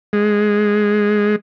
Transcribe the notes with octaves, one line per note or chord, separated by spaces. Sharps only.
G#3